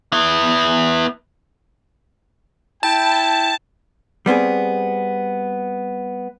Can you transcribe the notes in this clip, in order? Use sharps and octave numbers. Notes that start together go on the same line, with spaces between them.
B3 E4
E4 G5 A5
G3 B3 C4 G#4